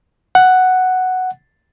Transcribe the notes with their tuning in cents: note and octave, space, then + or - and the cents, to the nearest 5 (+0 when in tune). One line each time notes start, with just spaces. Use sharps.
F#5 +0